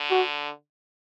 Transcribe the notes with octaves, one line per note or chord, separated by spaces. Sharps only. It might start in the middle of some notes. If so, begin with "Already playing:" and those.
Already playing: D3
F#4